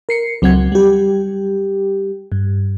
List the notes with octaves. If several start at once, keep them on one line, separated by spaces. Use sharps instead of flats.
A#4 C7 C#7
C#2 F#3 C4 F#5 G#6
G3 G4
G2